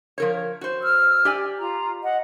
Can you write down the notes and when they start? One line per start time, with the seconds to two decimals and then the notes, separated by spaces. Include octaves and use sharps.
0.18 F3 A#4 C#5
0.61 F#4 C5
0.82 E6 F6
1.25 G4 D5 G#5
1.59 F4 A#5
2.03 D#5 F#5